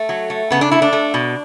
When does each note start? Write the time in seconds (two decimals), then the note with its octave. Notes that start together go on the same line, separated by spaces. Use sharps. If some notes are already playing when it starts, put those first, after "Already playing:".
Already playing: A3
0.09 F#3
0.30 A3
0.50 C#3 B3
0.61 D4
0.71 A3 E4
0.82 D4
0.93 A3
1.14 B2